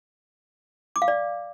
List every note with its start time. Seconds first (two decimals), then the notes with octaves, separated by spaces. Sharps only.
0.96 D6
1.02 F5
1.08 D5